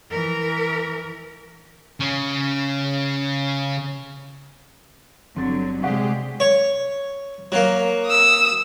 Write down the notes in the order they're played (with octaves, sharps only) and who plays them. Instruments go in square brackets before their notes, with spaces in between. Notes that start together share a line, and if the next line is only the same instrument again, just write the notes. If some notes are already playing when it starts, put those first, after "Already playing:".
[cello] E3 A#4
[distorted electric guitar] C#3 C#4
[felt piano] G1 A6 [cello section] D3 F#3 [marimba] C4
[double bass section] C3 G#3 [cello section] G4 G#4 [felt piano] D5 F#5 C#6
[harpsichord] C#5
F#3 A#3
[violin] D#6 E6